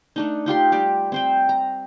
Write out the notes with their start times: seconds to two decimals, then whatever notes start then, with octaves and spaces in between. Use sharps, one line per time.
0.16 A3 D4 D#4
0.46 D#4 F4 G4 C6
0.72 G3 G4 D5
1.12 C4 C5 G5
1.49 A#5